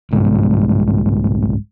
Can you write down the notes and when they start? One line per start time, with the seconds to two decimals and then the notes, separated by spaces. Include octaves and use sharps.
0.11 G1 C2 G#2